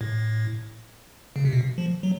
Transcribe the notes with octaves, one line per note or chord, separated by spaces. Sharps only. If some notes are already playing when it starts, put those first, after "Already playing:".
A2
C#3
C3
B2
F3
F#3